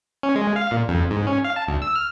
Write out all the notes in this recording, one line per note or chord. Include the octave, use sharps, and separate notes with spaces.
C#4
G#3
F5
A#2
F2
G#2
C#4
F5
A5
D2
E6
F6